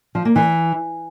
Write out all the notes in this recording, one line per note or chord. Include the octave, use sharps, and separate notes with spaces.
F3
A#3
E3